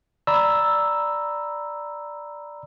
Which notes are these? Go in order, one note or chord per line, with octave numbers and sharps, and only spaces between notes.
D5 A#5 B5 E6